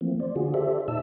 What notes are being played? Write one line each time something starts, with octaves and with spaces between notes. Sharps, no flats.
E3 F3 A3 A#3 C4
C5 D5
D3 F4 F#4 G#4
G4 A4 C5 D5 E5
A#2 D#4 E5 A5 E6